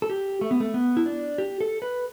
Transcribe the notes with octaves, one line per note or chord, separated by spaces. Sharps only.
A4
G4
A3
B3
A3
B3
E4
D4
G4
A4
B4